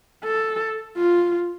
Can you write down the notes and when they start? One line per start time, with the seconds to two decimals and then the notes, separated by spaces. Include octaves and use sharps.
0.25 A4
0.97 F4